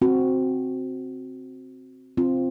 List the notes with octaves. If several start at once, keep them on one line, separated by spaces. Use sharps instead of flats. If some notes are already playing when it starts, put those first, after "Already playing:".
C4 F#4
C4 F4